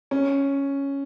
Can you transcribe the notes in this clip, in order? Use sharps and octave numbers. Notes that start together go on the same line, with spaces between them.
C#4